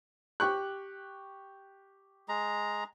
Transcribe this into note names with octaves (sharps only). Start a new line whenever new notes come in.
G4 C#6 F#6
G#3 A#5